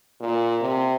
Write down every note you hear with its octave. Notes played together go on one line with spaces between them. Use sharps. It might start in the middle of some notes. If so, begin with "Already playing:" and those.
A#2
C3